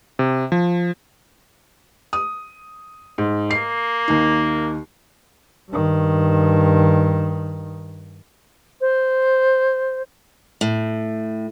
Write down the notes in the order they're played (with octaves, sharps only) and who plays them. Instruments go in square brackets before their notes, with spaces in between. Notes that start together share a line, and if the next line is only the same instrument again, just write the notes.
[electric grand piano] C3
F3
[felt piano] D#6
G#2
[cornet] A#3 [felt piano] C7
[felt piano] D#2 D#4
[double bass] G2 D#3
[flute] C5
[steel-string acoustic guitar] A2